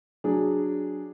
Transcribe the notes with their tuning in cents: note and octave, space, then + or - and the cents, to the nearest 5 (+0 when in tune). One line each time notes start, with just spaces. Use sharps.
F#3 +0 D4 +0 G#4 +0